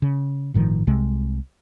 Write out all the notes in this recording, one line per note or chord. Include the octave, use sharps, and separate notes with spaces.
C#3
G1 A2 D#3 F3
C2 C3 G#3